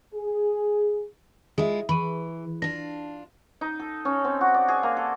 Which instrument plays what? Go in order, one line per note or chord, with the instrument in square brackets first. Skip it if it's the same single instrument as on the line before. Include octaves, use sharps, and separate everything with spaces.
[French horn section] G#4
[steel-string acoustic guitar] G#3 E4 F4 [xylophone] G#4 E5
[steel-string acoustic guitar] E3 [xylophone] B5 C#6 D#7
[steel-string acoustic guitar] D4 F4 [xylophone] A#6
[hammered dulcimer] D#4
A4
C#4
C4
F#4
D5
G#4
A#3
A4